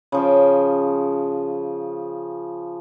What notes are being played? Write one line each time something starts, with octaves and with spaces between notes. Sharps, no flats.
C#3 F3 G5